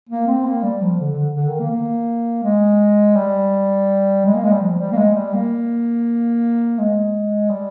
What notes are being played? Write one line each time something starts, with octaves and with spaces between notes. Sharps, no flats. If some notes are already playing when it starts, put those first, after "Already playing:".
A#3
C4
A#3
G3
F3
D3
D3
D3
D#3
A#3
A#3
G#3
G3
G#3
A#3
G#3
G3
F3
G3
A#3
G#3
G3
A#3
G#3
G3